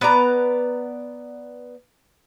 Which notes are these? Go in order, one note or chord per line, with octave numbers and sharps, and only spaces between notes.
B3 B4 D5 A#5